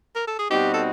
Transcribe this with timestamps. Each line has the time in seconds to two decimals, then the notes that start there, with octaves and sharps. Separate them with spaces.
0.16 A#4
0.27 A4
0.39 G#4
0.50 B2 G3 C4 D#4 F#4 G4
0.74 A4